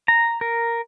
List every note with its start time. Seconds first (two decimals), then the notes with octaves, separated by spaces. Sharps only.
0.08 A#5
0.41 A#4